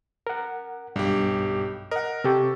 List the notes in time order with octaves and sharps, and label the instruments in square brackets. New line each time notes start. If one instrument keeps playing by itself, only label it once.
[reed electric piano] A#4 F#5
[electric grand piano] B1 G4 [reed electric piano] G2
[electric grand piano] A#4 [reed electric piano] D#5 F#5
[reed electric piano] C3 G4 C#6 [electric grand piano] A4